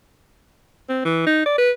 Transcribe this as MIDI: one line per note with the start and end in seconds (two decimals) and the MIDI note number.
0.89 1.03 60
1.05 1.26 52
1.26 1.46 63
1.46 1.53 74
1.58 1.71 71